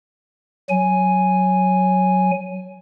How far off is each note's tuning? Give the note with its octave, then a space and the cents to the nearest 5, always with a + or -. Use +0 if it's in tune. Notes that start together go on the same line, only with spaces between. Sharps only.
F#3 +0 G#5 +0